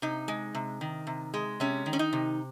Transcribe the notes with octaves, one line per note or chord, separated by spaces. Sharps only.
C3 D#4
G#3
C3
D#3
C3
G#3
C3 C#4
D#3
C#4
D#4
C3